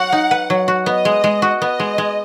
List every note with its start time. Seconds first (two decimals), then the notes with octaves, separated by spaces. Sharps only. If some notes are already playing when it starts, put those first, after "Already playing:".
Already playing: F#3 F#4 F#5
0.12 D#4
0.31 B4
0.50 F#3
0.68 F#4
0.86 B3 D#5
1.05 G#3
1.24 G#3
1.42 F#4
1.61 B3 D#5
1.80 G#3
1.98 G#3